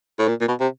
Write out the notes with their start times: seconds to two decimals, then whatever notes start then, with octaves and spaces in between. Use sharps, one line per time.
0.19 A2
0.28 A#2
0.41 A#2
0.48 B2
0.60 C3